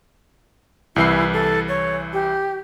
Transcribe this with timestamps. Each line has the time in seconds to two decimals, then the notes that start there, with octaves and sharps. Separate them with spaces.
0.96 C2 E3 E4 C7
1.33 A4
1.69 C#5
2.13 G4